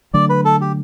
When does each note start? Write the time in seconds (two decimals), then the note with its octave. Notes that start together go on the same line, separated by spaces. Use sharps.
0.14 D3 F#3 A3 D4 D5
0.30 B4
0.45 A4
0.61 G4